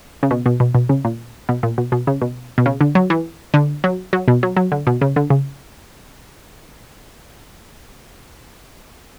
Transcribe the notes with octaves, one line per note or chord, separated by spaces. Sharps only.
C#3
B2
B2
B2
B2
C#3
A#2
B2
A#2
B2
B2
C#3
B2
B2
C#3
D3
F#3
E3
D3
F#3
F#3
B2
F#3
F#3
D3
B2
C#3
D3
C#3